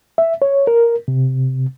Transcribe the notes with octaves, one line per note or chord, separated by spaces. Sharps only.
E5
C#5
A#4
C3